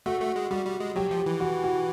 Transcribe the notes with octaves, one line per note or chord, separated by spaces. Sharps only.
A3 F#4
A3
G#3
G3 F#4
G3
G#3
F#3 G4
F3
E3
F#4
F#4